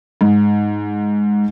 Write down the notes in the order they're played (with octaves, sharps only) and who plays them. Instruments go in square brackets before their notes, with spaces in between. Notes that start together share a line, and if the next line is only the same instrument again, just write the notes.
[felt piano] G#2